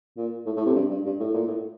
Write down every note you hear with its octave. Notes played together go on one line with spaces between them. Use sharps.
A#2
A2
A2
C3
G2
G2
G2
A2
A#2
A2